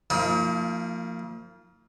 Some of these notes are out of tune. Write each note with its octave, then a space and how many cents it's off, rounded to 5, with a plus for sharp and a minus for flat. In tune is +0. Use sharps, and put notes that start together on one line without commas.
F3 +0 A#3 -30 D#4 +45